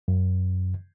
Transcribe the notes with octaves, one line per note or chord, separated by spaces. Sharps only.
F#2